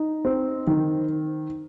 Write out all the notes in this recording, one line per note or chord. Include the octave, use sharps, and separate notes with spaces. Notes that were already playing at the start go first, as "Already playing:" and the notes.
Already playing: D#4
C4
D#3